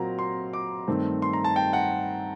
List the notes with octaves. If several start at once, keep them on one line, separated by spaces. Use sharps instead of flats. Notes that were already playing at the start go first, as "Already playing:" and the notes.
Already playing: A#2 F#3 C4 A#5
C6
D6
G2 D#3 A3 C4
C6
A#5
A5
G5
F#5